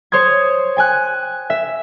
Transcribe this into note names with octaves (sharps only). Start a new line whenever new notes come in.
C5 C#5 C6 D#6 G#6
G5 G#5 F#6
E5